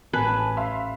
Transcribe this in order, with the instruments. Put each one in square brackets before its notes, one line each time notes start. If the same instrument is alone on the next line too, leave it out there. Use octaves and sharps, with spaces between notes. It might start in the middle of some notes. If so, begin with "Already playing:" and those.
[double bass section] A1 [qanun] B4 [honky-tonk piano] G#5 A5
[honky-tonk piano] E5 F5 C6